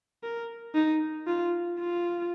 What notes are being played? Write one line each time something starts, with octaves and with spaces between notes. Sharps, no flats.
A#4
D#4
F4
F4